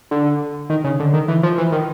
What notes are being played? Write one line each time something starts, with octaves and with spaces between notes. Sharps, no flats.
D3
D#3
C#3
D3
D#3
E3
F3
E3
D#3